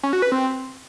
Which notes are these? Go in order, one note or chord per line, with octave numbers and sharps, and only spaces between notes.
C#4
F#4
B4
C4